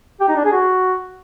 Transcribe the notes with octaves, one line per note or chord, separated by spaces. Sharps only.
G4
D#4
D4
G#4
F#4